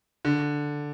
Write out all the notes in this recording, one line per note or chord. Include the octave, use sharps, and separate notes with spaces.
D3